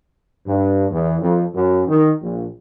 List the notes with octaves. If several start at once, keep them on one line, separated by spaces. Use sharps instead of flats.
G2
E2
F2
F#2
D#3
A#1